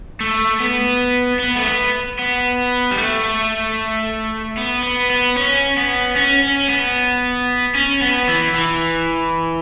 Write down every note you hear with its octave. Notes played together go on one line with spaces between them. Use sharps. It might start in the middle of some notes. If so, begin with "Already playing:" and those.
A3
B3
B3
A3
B3
B3
G3
A3
B3
B3
B3
C#4
B3
C#4
C#4
B3
C#4
B3
E3
E3